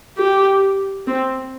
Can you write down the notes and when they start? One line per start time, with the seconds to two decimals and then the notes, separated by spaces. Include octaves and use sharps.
0.18 G4
1.07 C4